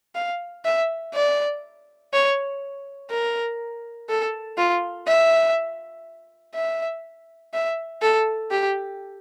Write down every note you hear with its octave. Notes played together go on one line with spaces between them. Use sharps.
F5
E5
D5
C#5
A#4
A4
F4
E5
E5
E5
A4
G4